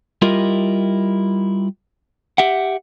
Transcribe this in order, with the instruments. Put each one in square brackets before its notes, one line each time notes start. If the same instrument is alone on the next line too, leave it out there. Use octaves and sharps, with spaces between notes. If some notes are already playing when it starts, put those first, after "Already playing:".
[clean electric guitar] G3 E4 F4 G4 A#4 D#5
G4 E5 F#5